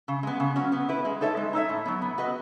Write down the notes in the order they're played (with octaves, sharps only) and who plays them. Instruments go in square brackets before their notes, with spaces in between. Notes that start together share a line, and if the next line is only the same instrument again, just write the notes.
[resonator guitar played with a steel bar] C#3
G#3 B3
C#3
F#3 C#4 F#4
B3
E4 B4
G#3
D#4 A4 C#5 E5
G#3
D#4 A4 C#5 E5
A2
F#3 B3
B3
F#4 B4 D#5